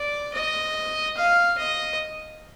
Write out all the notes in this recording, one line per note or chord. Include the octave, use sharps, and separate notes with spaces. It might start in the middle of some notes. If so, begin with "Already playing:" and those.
Already playing: D5
D#5
F5
D#5